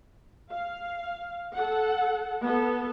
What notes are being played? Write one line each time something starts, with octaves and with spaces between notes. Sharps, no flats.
F5
A4 F#5
B3 A4